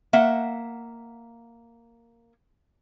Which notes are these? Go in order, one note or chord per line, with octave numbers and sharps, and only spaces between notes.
A#3 E5 F#5